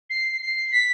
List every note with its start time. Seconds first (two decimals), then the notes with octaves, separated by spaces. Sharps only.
0.10 C7
0.41 C7
0.72 B6